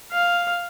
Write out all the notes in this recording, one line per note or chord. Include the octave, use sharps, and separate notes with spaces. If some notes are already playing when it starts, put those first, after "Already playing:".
F5